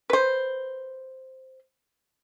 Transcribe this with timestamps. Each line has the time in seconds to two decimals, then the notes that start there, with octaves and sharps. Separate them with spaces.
0.10 B4 C5